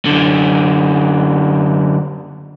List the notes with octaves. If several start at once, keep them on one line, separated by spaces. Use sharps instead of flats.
F#2 D3